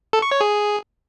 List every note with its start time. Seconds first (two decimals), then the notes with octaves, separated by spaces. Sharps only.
0.13 A4
0.22 C#6
0.31 C#5
0.41 G#4